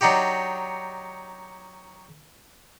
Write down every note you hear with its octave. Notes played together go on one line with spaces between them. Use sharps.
F#3 D4 D#4 F#4 G4